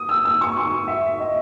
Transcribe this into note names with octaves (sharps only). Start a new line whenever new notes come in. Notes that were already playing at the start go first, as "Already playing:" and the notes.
Already playing: D#6
E6
E6
C#6
C#6
E5
D#5